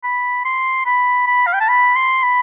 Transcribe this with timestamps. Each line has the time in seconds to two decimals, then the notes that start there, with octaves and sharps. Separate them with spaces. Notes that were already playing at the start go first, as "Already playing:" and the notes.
0.04 B5
0.45 C6
0.86 B5
1.27 B5
1.47 F5
1.54 G5
1.61 A5
1.68 B5
1.96 C6
2.23 B5